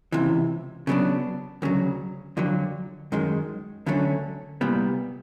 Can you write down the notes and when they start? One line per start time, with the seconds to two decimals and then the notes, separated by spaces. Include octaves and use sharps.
0.12 C#2 C3 E3
0.87 C#3 F#3 B3 D4
1.62 D2 C#3 F#3
2.37 F2 D3 F#3
3.12 F#2 D#3 G#3
3.86 D2 D3 F#3 A3 C#4
4.61 C2 A#2 G3 B3